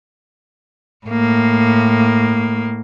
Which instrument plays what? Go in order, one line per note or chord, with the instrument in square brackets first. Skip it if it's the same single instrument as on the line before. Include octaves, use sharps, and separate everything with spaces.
[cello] A2 A#3